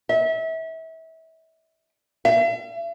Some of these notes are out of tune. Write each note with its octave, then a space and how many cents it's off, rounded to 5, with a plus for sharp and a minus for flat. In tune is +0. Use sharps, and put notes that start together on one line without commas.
E5 -30
E5 +45